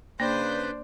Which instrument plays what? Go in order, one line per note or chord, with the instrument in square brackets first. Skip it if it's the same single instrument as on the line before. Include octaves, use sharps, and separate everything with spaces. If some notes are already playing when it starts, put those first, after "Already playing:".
[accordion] C#3 B4 G6 [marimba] A#3 [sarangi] D4 [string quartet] C5